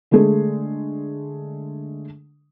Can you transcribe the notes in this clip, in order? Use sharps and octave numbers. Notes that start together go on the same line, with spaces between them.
D3 G#3 A3 G#4